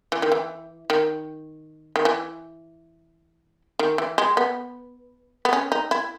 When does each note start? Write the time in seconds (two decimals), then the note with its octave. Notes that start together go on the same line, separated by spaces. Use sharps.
0.12 E3
0.22 D#3
0.32 E3
0.90 D#3
1.96 D#3
2.05 E3
3.79 D#3
3.98 E3
4.18 G#3
4.37 B3
5.45 B3
5.53 C#4
5.72 D#4
5.91 E4